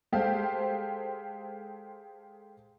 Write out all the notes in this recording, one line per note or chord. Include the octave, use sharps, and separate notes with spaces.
G#3 G4 A4 C5 F5